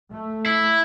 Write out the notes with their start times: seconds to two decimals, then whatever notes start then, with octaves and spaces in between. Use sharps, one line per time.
0.11 A3
0.46 E4